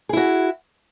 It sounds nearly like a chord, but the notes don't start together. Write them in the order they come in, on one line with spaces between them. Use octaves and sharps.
G#4 E4 F#4